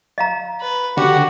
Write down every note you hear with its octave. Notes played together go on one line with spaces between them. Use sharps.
D#5 F5 A#5
B4
D3 F#4 G4 F#5